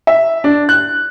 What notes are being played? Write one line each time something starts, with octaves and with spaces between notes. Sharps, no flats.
E5
D4
F#6